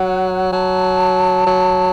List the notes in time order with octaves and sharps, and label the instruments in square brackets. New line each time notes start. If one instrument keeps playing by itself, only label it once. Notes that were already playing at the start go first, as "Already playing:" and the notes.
Already playing: [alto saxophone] F#3 [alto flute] F#5
[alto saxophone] F#3 [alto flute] A5
[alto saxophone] F#3